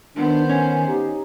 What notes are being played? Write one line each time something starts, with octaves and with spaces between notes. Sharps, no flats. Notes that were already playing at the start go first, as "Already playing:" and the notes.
D#3 B3 D4 C5
C#4 G#5
D#4 G4